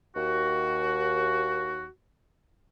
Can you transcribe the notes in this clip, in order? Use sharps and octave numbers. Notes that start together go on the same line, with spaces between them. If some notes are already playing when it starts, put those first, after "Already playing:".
D#2 F#4